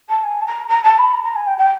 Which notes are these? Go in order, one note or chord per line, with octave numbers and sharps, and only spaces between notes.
A5
G#5
A5
A#5
A#5
A5
B5
A#5
A#5
G#5
G5
G5